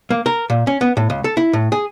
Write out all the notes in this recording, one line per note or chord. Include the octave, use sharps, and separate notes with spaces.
A#3
A#4
A#2
C#4
B3
A2
C#2
A4
E4
A2
G#4